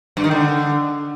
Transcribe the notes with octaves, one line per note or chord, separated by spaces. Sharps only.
G2
D#3
D3